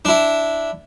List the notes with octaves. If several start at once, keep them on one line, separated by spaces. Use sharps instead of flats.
D4 E4